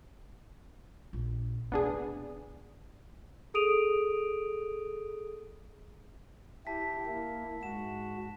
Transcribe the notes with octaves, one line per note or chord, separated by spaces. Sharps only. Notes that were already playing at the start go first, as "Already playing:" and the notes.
A#1
F1 C3 B3 D4 G#4
G#4 A4 D#6 D7 D#7 F7
E4 G4 A5 B6
A#3 E4
G#2 F#4 E7